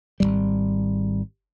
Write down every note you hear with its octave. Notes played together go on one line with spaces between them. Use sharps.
G#1 C#2 G3